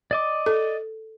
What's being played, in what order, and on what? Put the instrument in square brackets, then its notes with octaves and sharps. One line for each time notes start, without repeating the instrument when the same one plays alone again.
[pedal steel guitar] D5 D#5 D6
[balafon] A4